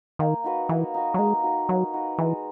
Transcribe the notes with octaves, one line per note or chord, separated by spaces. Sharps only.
D#3 A#3
D#4 F#4 B4
E3 A#3
D#4 F#4 B4
F#3
G#3 A#3
D#4 F#4 B4
F#3 A#3
D#4 F#4 B4
E3 G#3